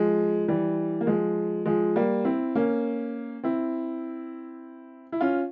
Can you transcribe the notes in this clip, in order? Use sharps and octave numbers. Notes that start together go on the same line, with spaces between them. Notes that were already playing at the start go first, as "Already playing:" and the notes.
Already playing: F3 G#3
E3 G3
A#3
F3 G#3
F3 G#3
G3 A#3
C4 E4
A#3 C#4
C4 E4
E4
C#4 F4